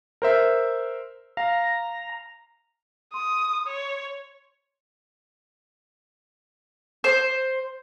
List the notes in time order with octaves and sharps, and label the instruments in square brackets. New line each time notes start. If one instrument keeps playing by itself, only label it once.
[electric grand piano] A#4 C5 E5
[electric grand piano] F5 [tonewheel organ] A#5
[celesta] C6 [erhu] D#6
[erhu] C#5
[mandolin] C5